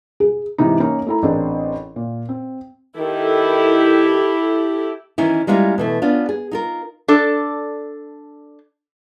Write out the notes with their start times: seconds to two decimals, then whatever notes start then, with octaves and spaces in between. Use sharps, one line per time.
0.20 G#4
0.58 G#2 C3 E3 D#4
0.80 A#3 C#4 D#4
1.07 A3 E4 A#5
1.23 A1 C4 D4 G#4 A#4
1.96 A#2
2.29 C4
2.97 D#3 E4 G4 A4
5.18 D#3 E3 C#4 D#4 E4
5.47 G3 G#3 A#3 C#4 E4 F4
5.78 B2 E3 A3
6.02 B3 C#4 D4 F4
6.29 G#4
6.51 D#4 F4 A#4
7.08 D4 A4 D5